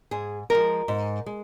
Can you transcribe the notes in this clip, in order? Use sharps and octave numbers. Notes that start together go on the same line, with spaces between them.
G#2 G#4
F3 G#3 A#4
G#2
G#3